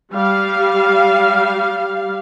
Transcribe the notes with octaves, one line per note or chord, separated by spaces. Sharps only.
G3 F5